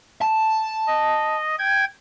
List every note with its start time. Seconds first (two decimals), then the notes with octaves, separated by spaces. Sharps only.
0.21 A5
0.87 D#5
1.59 G5 G#6